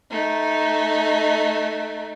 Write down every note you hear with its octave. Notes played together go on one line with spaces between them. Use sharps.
A3 D#4